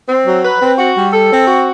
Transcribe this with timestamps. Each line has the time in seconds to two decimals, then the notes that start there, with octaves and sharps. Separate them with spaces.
0.08 C4
0.27 F#3
0.44 B4
0.60 C4
0.78 F#4
0.95 G3
1.13 A4
1.30 C4
1.47 F#4